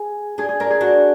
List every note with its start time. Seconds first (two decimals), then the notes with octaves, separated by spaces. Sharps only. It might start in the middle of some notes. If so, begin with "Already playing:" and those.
Already playing: G#4
0.38 D4 G#4
0.49 G#4
0.60 D4 A#4
0.70 G#4
0.81 D4 F#4